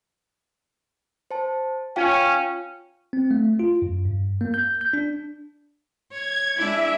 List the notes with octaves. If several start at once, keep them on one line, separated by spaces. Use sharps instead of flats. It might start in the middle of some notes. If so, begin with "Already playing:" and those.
C5 A5
C#4 F4 F5 G5
C4
A3
F4
F#2
G2
A#3
G6
G6
D4
C#5 G#6
G#3 D4 E4 E5